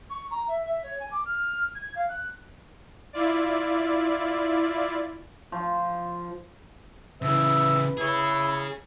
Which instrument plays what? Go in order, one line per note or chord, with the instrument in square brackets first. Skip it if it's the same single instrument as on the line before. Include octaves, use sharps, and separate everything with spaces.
[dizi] C#6
A#5
E5
E5
C#5
G#5
D6
F6
G#6
F5
F#6
[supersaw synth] E4 F4 D5
[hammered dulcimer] F3
[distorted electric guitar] C#3 E3 [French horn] B4 [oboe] E5
[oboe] E4 [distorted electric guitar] G#4 C#5